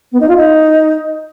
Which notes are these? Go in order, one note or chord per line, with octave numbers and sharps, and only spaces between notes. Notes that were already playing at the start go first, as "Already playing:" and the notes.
B3
D#4
F4
D#4